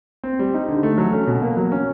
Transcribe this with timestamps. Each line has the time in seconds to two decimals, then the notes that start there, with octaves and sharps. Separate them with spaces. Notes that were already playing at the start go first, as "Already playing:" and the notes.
0.24 C4
0.39 G3
0.54 D#4
0.68 D3
0.83 A3
0.98 F#3
1.13 C#4
1.27 B2
1.42 A#3
1.57 F#3
1.72 C#4